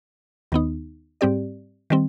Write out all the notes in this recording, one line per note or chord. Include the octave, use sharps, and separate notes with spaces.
D#2 D#3 B3 D#4
G#2 G3 C4 G4 D5
D#3 G3 C4